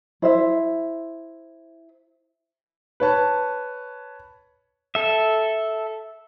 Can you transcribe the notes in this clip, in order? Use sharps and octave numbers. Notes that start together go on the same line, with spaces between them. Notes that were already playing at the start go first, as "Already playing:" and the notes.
E4 C5 E5
B4 C#5 A5
A4 E5